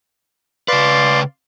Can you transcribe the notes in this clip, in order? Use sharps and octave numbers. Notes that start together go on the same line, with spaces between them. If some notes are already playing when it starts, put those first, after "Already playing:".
C#3 B4 D5 F5 C6